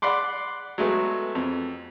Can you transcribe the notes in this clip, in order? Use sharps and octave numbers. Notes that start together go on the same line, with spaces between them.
D5 F#5 B5 C6 D6
F#3 G#3 A3 B3
F2